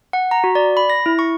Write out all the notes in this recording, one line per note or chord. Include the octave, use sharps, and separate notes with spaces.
F#5
A#5
F#4
D5
B5
A#6
E4
C#6